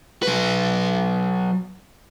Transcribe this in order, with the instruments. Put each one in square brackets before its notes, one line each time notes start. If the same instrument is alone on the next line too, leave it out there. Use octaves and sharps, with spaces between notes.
[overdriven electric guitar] F#3 B4